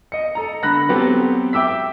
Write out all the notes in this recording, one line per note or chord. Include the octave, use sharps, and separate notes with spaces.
D#5 C#7
A4 A#5
D3 B5 F#6 A#6
F#3 B3 C4 G4 A4
E5 G5 D6 E6 B6